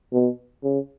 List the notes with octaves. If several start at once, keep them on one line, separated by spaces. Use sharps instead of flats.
B2
C#3